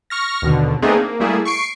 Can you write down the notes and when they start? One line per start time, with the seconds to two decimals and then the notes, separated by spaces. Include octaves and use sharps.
0.10 C#6 F6 A#6
0.42 D#2 B2 D3
0.82 A3 B3 C4 D4 D#4 G#4
0.95 A#3
1.20 G3 A3 A#3 E4 G#4
1.45 C#6 C7 D7